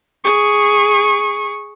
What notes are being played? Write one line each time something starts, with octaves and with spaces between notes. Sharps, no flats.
G#4 C#6